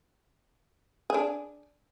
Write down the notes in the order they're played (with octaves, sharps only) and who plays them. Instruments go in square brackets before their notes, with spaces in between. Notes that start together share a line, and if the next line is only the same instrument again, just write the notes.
[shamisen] D4 G#4